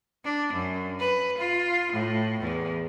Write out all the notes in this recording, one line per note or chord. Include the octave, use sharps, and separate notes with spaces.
D4
F#2
B4
F4
A2
E2